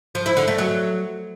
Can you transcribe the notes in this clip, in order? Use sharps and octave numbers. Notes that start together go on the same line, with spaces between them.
F3
E4
D3
A3
F#3